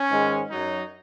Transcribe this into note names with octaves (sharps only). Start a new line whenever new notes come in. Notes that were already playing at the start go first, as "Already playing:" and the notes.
Already playing: C#4
G#2 D#3 G#3
F#2 F#3 D#4